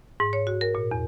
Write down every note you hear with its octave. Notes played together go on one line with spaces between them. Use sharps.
G#2
C#5
F#4
A#4
A#2
E2